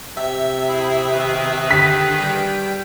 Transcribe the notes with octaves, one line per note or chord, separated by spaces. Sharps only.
C3 E5
E4 G#4
D#3 G#4 B4
D3 G4 B6
G3 G5